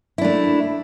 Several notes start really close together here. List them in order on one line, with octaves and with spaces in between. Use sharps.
E4 D4 A3